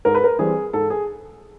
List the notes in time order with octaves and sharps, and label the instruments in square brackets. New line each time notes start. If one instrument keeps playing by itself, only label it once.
[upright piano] G#2 A#4
B4
A#4
E3 G3 C4 G#4
G#2 A4
G#4